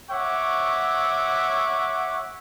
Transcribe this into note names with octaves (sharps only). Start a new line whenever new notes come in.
C#5 E5 F#5 C#6 D6